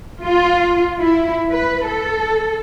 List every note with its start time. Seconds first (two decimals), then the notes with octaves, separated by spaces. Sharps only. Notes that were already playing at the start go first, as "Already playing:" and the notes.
0.23 F4
0.99 E4
1.50 B4
1.85 A4